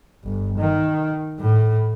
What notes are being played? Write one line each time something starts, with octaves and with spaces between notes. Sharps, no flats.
G1
D#3
A2